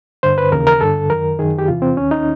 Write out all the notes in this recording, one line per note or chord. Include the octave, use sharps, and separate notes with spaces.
G2 D3 C5
B4
D#2 C#3 E3 A#4
A#4
G2 D3 A4
F#2 D#3 A#4
F#2 D#3 G#4
G4
E2 C3 E3 F4
C4
D#2 D#3 C#4
D#4